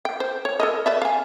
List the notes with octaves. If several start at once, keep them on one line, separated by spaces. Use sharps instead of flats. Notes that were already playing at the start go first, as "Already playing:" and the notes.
G5
C5
C#5
A4 A#4 D#5
B4 D5 E5
F5 G#5